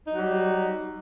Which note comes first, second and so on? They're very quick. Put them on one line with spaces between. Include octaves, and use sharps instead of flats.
D#4 F#3 G3